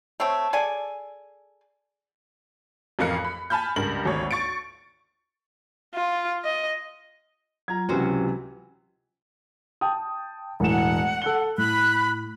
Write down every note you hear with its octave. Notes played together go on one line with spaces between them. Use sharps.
A3 C4 C#5 G5
G#4 A4 D5 G#5
A1 F2 A#4 F5 F#6 C#7
B5
G#5 A5 B5 F6 G6
C#2 G2 A#4 F#7
G#1 D2 C#5
C#6 A6 C#7 D7
F4
D#5
F#3 F4 A#5 G#6
C#2 C3 E3 C#4 F#4 C5
G5 A5 D#6
E1 A2 F#5 E7
A4 F#6 G7
A2 B5 F#6